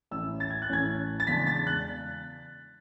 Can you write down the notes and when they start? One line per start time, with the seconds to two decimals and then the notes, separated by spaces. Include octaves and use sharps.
0.11 A1 A2 E3 A3 C#4 E6
0.40 A6
0.50 G#6
0.62 F#6
0.69 A1 A2 E3 A3 C#4 G#6
1.20 A6
1.27 E2 C#3 G#3 D4 B6
1.47 A6
1.67 F#6